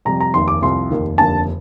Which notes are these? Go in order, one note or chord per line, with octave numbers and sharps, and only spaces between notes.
F2 C3 G3 A#5
A#5
F1 D#2 D#3 C6
D6
C2 C3 F3 C6
F1 D#2 D#3
F1 D#2 D3 A5